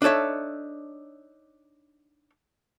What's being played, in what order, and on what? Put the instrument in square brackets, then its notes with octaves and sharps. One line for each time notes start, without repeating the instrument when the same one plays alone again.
[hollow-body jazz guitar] D4 D#4 A4 C#5 E5